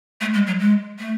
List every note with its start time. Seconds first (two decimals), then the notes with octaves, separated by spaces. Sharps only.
0.21 A3
0.34 G#3
0.47 F#3
0.60 G#3
0.99 A3